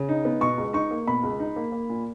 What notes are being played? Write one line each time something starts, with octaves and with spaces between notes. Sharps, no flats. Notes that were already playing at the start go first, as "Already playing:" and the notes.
Already playing: C#3
D#4
B3
B2 C#6
C#2
D#4 C#6
A#3
B2 B5
C#2
D#4
A#3
A#3
A#2